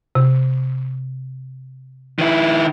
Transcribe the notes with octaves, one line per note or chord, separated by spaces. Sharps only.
C3
D#3 E4